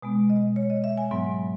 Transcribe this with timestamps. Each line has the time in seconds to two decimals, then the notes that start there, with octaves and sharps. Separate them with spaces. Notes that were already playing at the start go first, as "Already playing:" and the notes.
0.02 B2 G#3 B3
0.30 D#5
0.56 C#5
0.70 D#5
0.84 E5
0.97 G#5
1.11 G#2 F#3 B3